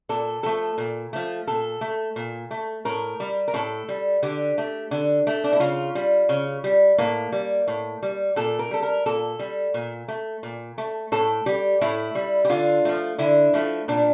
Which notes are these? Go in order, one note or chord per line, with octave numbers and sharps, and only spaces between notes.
A#2 A4
F3 A3 A4
A#2
F3 A3
A#2 A4
A3
A#2
A3
A2 A#4
G3
A#4
A2 A4
G3
D3 G4
A3
D3
A3
D4
E4
C#3 F4
G3
C#3
G3
A2 A#3
G3
A2
G3
A#2 A4
A#4
G3 A4
A#4
A#2 A4
G3
A#2
A3
A#2
A3
A2 A4
G3 G4
A2 E4
G3
G4
D3 F4
F3 A3
D3 E4
F3 A3
A#2 D4